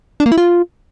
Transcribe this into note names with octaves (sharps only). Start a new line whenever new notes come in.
D4
A#3
E4
F4